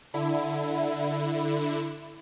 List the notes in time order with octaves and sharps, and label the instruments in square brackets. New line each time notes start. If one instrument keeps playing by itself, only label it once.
[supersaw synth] D3 E4